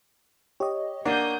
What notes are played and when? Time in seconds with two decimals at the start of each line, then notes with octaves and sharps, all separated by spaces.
0.60 G4 C#5 D#5
1.05 A#3 D4 C#5 F#5 D#6 G6